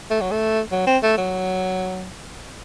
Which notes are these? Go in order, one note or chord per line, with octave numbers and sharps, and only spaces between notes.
A3
F#3
A3
F#3
C4
A3
F#3